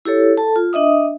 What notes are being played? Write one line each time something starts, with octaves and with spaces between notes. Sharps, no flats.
E4 G4 A4 C#5
A4 A5
F4
D4 D#5 E5 D#6